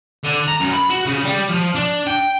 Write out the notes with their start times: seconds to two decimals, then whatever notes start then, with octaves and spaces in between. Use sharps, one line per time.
0.24 D3
0.48 A#5
0.60 F#2
0.73 B5
0.90 F#4
1.05 C#3
1.24 G3
1.49 F3
1.75 D4
2.07 G5